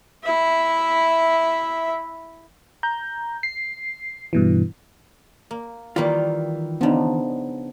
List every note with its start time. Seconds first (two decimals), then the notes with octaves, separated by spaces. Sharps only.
0.24 E4 E5
2.83 A#5 G6
3.43 C7
4.33 G2 B2 E3
5.51 A#3
5.96 D#3 E3 G3 A#3 F4
6.81 C#3 F3 B3 D4 D#4